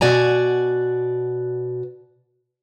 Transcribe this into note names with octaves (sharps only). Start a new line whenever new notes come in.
B2 F#4 D5 G#5 A#5